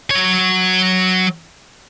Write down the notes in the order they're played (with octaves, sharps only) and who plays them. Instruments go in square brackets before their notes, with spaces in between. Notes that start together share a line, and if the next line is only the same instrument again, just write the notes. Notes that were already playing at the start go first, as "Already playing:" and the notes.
[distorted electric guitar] F#3 C#5